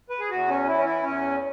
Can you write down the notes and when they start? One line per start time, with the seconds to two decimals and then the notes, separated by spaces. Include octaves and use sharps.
0.10 B4
0.20 G#4
0.30 E2 F#4
0.49 C#4
0.66 E3 E4
0.78 C#4
0.85 E4
1.03 E2 C#4